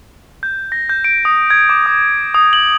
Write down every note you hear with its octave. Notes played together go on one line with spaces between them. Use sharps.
G6
A#6
G6
D7
D#6
G#6
D6
D#6
D#6
F#7